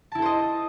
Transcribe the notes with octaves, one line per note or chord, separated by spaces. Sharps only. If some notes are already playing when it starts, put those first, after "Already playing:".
E4 A4 C5 D#5 A5